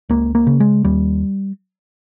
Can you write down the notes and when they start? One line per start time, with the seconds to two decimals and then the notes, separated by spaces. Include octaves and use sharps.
0.09 C#2 A#3
0.35 A#3
0.47 C#3
0.60 G#3
0.84 D#2 G3